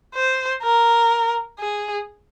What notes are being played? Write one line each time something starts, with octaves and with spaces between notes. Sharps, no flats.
C5
A#4
G#4